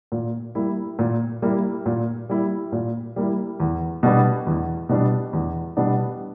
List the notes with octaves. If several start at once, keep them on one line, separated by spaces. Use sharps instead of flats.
A#2
G3 A#3 E4
A#2
G3 A#3 E4
A#2
G3 A#3 E4
A#2
G3 A#3 E4
E2
B2 G3 B3 D4
E2
B2 G3 B3 D4
E2
B2 G3 B3 D4